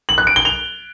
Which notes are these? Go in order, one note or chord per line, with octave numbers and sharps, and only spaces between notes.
F#7
F#6
D7
G7
F7